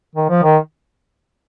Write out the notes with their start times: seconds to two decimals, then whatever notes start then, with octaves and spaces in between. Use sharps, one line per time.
0.15 D#3
0.29 F3
0.43 D#3